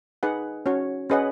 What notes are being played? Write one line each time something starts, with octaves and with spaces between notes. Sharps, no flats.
D#4 G#4 B4 F#5
C#4 F#4 C#5
C#4 G#4 B4 D#5 F#5